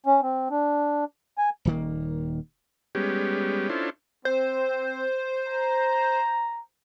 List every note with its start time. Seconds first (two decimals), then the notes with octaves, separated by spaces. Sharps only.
0.06 C#4
0.22 C4
0.50 D4
1.38 G#5
1.65 D#1 D#3 A#3
2.95 G3 G#3 B3 C#4 G4
3.69 C#4 D4 E4 F4 A4 C5
4.25 C4 C5
5.48 A#5